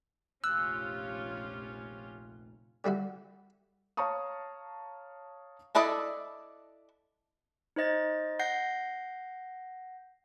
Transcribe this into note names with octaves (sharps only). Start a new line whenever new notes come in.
F1 A#1 C#4 F4 G4 E6 F#6
D3 G3 E4 F#4
C#5 F5 A5 A#5 C#6 D#6
D4 E4 A4 D5 D#5
D#4 C5 D#5 A6
F#5 G6 A#6 C7